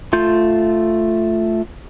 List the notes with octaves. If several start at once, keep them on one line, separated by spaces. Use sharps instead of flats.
A3 F4 G6